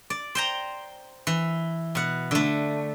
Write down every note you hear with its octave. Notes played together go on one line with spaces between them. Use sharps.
D5
C5 G5 A#5
E3
B2 F#5
D3 A3